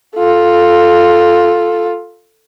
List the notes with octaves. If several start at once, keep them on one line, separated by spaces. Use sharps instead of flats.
F4 A4